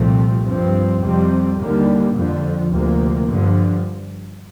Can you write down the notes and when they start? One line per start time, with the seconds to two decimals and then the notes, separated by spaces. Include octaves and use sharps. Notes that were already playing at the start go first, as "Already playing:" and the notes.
Already playing: C2 A#2 F3 A3 C4
0.46 G2 F3 C4
1.02 F2 C3 G3 C4
1.58 D#2 D3 G3 A#3
2.15 F2 D3 F3
2.71 D2 C3 F3 A#3
3.28 G2 D3 F3